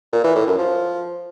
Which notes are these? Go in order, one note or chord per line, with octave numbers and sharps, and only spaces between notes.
A#2
E3
A2
F#2
F3